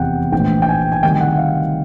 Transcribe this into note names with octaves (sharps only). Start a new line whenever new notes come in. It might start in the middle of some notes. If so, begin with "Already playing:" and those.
Already playing: F1 E2 C3 E3 F#5 G5
A#1 A2 E3 G5
G5
G#5
G#5
D2 C3 D#3 G3 G5
F#5
F5